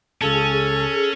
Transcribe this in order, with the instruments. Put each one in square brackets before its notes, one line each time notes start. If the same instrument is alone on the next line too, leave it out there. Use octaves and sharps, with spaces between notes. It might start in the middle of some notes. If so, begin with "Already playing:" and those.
[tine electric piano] C#2 C#3 A5 [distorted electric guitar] C#4 [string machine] G#4 [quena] A4